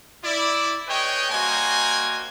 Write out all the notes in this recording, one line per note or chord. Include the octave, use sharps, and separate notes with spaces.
E4 D5
G#4 B4 C#5 D#5 G5
G3 A#3 F#4 C5 D#5 G#5